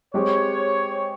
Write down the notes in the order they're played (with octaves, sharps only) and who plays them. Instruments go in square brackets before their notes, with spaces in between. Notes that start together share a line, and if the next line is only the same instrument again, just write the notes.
[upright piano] G#3 C4 G4 [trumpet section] C#5